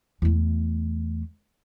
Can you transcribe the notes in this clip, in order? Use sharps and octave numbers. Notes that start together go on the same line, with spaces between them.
E2 A3